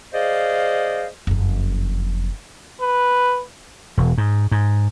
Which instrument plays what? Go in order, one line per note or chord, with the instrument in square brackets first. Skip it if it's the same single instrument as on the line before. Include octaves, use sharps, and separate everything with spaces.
[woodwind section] G#4 C5 D5 D#5 F5
[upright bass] F#1 F2
[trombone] B4
[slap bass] E1
G#2
G#2